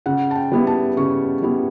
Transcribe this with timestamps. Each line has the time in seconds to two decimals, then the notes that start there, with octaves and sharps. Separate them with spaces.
0.06 C#3 F#5
0.31 A5
0.36 G5
0.52 G3 B3 E4
0.67 A5
0.97 C#3 C#6
1.42 G3 B3 E4